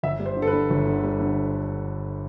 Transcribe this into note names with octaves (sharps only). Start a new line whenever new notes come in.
G1 E5
G3
C5
D3
A4
B4
D3
G1
D3
G3
D3